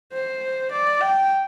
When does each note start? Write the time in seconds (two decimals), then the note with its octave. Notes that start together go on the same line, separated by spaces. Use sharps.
0.13 C5
0.71 D5
1.01 G5